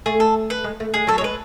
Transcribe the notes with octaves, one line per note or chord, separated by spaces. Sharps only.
A3 G#4
A4
B4
G#3
A3
G#3 G#4
F#3 A4
C#5
G#3 B4